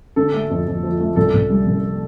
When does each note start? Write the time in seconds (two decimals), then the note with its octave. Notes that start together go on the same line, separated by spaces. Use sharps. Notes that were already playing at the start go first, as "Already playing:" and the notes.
0.16 D3 A4
0.34 A3
0.50 F2
0.66 F2
0.83 F3
1.00 A3
1.16 C2 A4
1.33 C2
1.50 G3
1.67 C2